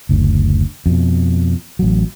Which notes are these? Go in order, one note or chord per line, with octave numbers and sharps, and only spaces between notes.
F#1 D2
F2 B2
A1 F#3